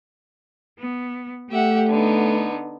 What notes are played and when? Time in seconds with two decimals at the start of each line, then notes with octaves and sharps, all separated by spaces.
0.79 B3
1.51 A3 G4 E5 F#5
1.88 D3 B3 D#4